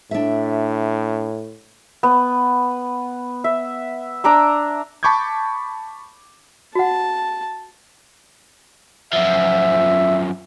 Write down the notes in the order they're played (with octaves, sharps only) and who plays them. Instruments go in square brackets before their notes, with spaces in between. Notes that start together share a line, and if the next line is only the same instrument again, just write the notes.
[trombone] A2 [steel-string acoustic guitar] D4 E5
[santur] B3
E5
D4 A#5 D6 E6
[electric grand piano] A5 B5 C#6 D6 G6 G#6
[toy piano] F#4 F#5 [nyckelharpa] A5
[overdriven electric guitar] F#2 F3 [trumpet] E5